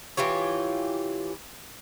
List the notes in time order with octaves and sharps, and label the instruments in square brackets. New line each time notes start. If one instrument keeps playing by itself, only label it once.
[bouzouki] E3 F4 G4 C#5